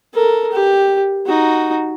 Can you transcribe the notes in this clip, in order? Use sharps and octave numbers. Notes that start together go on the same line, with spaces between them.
A4 A#4
G4
D#4 F#4